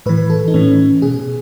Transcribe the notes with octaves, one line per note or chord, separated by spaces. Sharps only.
A2 E3 B4
A4
D#4
A2 E3 C#4
B2 G#4